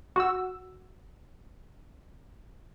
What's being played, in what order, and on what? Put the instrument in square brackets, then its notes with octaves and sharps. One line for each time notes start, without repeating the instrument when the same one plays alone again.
[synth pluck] F#4 E6